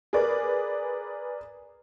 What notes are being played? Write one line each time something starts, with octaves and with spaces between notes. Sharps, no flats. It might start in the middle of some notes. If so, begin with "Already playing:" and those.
G#4 A#4 B4 D5